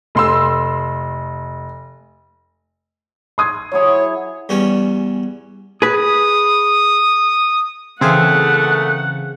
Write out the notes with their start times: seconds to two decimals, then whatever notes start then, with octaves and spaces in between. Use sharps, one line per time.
0.15 F1 C6 E6
3.38 C6 D#6 G#6
3.72 F#3 E4 G#4 C#5
4.49 E2 G3 C#4
5.82 G#4 B4 D#6
8.01 D#2 C#3 E3 A3 C4 G#4 F5 F#5